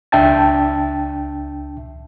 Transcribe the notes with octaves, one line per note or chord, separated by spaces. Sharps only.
C#2 D4 E5 G5 A5 A6